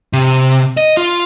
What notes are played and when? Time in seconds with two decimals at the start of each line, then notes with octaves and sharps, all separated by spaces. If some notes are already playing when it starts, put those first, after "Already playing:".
0.13 C3
0.77 D#5
0.97 F4